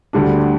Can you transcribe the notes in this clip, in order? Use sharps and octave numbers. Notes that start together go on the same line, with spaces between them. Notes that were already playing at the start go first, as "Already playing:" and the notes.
D2 D3 G3 D4